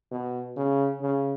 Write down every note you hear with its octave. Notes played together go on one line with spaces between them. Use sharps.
B2
C#3
C#3